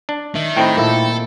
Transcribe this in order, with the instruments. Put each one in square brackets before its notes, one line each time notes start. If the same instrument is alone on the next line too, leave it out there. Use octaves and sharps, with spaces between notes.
[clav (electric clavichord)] D4
[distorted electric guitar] D#3 [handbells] E5
[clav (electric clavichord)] A2 C4 D#4 [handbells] G5 B5
[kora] A#2 E4 [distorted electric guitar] A4